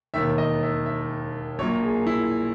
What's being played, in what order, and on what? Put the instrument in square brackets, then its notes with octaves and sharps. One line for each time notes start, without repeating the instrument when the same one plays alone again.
[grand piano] E1 D#2 D#3 E5
D#5
E5
E5
A#1 A#2 F#3 C#5
G#4
E4